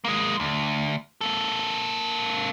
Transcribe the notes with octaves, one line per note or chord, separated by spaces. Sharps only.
G#3 A#3
D2
A#3 A4